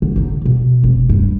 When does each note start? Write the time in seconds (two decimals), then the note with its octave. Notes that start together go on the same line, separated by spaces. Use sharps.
0.02 D3
0.16 D3 D#4
0.45 B2
0.84 F1
1.09 G2